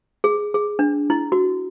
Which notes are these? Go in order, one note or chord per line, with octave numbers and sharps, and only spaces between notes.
G#4
G#4
D4
E4
F#4